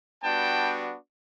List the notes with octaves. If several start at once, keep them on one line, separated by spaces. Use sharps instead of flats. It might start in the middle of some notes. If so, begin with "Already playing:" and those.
G3 B3 D4 F#4 G5 A5